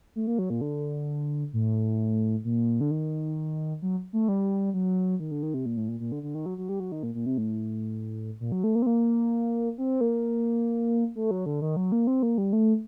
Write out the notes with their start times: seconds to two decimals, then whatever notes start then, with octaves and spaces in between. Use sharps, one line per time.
0.15 A3
0.27 A#3
0.39 F#3
0.50 A#2
0.61 D3
1.53 A2
2.45 A#2
2.81 D3
2.91 D#3
3.82 F#3
4.13 A3
4.28 G3
4.74 F#3
5.20 D#3
5.31 D3
5.43 D#3
5.54 C3
5.66 A#2
5.77 A2
5.88 A#2
6.00 A#2
6.12 D3
6.23 D3
6.35 D#3
6.46 F#3
6.58 F#3
6.69 G3
6.80 F#3
6.92 D#3
7.03 A#2
7.15 A#2
7.26 C3
7.38 A2
8.40 A#2
8.52 F#3
8.64 A3
8.75 A#3
8.82 C4
8.86 A#3
9.78 C4
10.01 A#3
11.15 A3
11.31 F#3
11.46 D3
11.62 D#3
11.77 F#3
11.92 A#3
12.07 C4
12.23 A#3
12.38 G3
12.53 A3